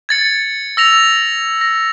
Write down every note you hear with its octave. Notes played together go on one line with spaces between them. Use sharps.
G#6 A6 C#7
E6 A#6 F7
A#6